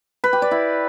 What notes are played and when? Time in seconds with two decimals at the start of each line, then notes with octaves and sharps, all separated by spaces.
0.24 B4
0.33 G4
0.42 D5
0.51 E4